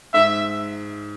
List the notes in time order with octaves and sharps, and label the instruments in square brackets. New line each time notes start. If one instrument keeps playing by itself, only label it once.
[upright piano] G#2 [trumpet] E5